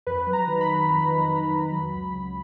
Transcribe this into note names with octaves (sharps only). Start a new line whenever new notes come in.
F2 B4
F#3
A#5
D#3
B5
D#3
F2
D#3
D#3
F2
F#3
C#2
C#2